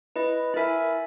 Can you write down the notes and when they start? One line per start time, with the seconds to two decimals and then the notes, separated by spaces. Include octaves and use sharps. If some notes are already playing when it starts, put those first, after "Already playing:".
0.16 E4 B4 D#5
0.54 E4 A#4 E5 G#5